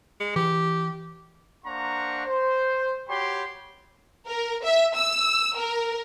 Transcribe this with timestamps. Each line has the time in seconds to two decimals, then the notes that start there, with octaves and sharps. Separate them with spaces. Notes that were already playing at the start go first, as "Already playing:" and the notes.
0.20 G#3
0.36 E3 G4
1.65 A#3 D4 C5 F#5 A#5 C#6
2.26 C5
3.09 F#4 G4 C#5 G5 B5 C6
4.28 A#4
4.64 E5
4.96 E6
5.57 A#4